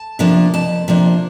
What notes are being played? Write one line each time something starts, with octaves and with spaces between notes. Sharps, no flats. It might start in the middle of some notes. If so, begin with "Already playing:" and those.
Already playing: A5
C3 F3 A#3 D4
F2 A5
C3 F3 A#3 D4